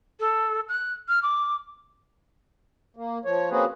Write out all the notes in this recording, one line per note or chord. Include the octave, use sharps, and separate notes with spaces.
A4
F#6
F6
D6
A#3
F3 C#5
A#3 C4 C#4 F#4 G#4 B4